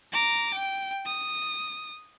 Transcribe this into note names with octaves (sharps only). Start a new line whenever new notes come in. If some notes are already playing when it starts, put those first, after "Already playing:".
A#5 D6
G5
D#6